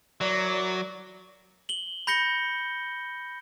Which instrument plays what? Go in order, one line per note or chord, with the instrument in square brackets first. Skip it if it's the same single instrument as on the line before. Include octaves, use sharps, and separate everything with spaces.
[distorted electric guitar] F#3 [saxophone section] E4 A#4 D5
[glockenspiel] F#7 G7
B5 G6 A#6 C#7 G7